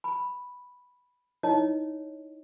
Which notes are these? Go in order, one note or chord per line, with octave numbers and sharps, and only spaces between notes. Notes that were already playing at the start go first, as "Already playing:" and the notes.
B5
D#4 E4 C#5 D#5